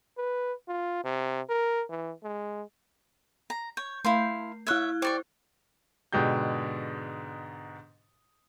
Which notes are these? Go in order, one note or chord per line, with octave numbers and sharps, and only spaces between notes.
B4
F4
C3
A#4
E3
G#3
A#5
C#5 G6
A3 E4 F5 C6
E4 C#5 E5 F#6 G#6
G4 C5 D5 C#6
G#2 B2 D3 G#3 G4 G6